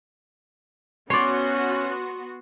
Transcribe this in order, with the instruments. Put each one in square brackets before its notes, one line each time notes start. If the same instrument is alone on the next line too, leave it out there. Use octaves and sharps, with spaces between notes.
[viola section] B3 F#4 [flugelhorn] C#4 [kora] C#5 D5 [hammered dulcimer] C6